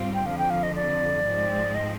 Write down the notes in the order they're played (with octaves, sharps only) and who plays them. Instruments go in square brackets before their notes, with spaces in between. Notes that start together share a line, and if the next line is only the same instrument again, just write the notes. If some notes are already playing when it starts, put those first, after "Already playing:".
Already playing: [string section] G#2 G3 C4 F4
[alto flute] G5
[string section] F2 D3 F3 [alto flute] F5
[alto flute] G5
F5
D#5
D5
[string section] G#2 F3 G#3 C4
[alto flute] D#5